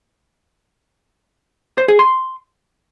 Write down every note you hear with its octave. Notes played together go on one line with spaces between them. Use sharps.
C5
G#4
C6